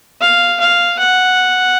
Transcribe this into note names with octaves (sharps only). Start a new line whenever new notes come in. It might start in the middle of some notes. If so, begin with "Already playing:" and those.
F5
F5
F#5